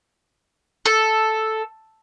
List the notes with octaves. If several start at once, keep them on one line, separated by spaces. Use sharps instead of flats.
A4